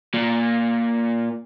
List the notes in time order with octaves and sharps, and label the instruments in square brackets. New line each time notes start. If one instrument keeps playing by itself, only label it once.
[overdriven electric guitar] A#2